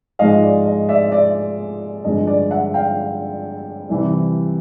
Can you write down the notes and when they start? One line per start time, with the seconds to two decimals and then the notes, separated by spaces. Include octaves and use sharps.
0.19 G#2 F3 G#3 D#5 F5
0.43 D5
0.66 D#5
0.89 D5 E5
1.12 D5 E5
2.04 G2 D3 F3 G#3 D#5
2.27 D5
2.51 E5 F#5
2.74 F5 G5
3.89 C2 C3 E3 G3